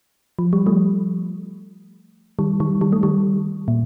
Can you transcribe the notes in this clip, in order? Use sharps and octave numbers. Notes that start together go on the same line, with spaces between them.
F3
G3
F3 A3
D#3 G3
D#3 G3
D#3 G3
A3
D#3 G3
A#2